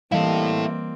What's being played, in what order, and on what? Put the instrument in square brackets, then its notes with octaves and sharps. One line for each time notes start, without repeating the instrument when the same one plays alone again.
[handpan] E3 G3 D#5 [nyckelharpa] A#3 C4 [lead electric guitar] E4 A4 [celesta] F5